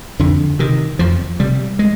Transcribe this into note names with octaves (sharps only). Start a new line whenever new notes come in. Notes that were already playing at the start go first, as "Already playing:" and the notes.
F2 D3
C3 D#3
F2 F3
C3 G3
G#3